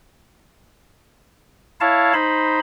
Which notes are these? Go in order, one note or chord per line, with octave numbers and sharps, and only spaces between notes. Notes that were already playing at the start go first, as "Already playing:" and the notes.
E4 C#5 F5 A5
D#4 C5 B5